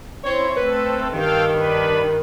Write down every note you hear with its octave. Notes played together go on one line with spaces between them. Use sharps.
C4 E4 C5 C#5
A3 C4 A4 B4
G2 D#3 A4 F5 G5
D4 B4